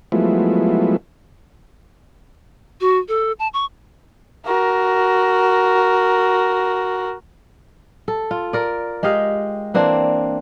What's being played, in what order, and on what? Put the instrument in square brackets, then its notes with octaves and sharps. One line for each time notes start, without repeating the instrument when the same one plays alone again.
[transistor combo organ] F3 F#3 G#3 A3 B3 E4
[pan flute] F#4
A4
A5
C#6
[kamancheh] F#4 A#4
[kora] A4
F4
A#4 D5
G#3 G4 D#5 F5
E3 A#3 C4 D4